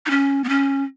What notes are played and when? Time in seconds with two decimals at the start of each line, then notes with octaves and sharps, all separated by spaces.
0.06 D#4
0.10 C#4
0.44 B3
0.49 C#4